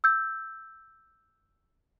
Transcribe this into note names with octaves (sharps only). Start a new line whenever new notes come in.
E6 G6